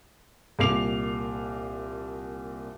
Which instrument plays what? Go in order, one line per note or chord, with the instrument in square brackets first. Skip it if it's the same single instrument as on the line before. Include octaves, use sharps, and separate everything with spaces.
[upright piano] C2 A#2 D6 C7 F7